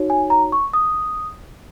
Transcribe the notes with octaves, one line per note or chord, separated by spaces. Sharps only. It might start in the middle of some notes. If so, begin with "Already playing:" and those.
Already playing: D#4 F#4 C#5
G#5
A#5
C#6
D#6